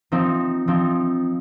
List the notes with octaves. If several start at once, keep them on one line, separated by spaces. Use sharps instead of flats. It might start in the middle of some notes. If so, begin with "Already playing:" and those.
F3 C4 D#4
F3 C4 D#4